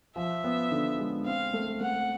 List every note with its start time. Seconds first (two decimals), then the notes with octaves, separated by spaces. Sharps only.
0.16 F3 E5
0.44 B3
0.71 D3
0.98 G#3
1.26 C4 F5
1.53 A3
1.81 A3 F#5